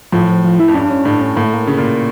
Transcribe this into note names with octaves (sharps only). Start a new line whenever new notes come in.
A2 F3
F3
F3
E4
F2
G2 C#4
D4
C#4
A2 D4
C#4
A2 A#3
A3
A#3
C#3
A#2